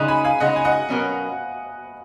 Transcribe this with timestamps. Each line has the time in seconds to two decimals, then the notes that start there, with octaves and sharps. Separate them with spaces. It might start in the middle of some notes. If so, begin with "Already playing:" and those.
Already playing: C#3 G#3 D#4 D#6 F#6
0.08 G#5 B5
0.24 F5 G#5
0.40 C#3 G#3 D#4 D#5 F#5
0.56 G#5
0.65 D#5 F#5
0.89 B2 F#3 C#4 F#4 A#4